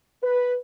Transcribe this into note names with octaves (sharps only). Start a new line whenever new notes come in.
B4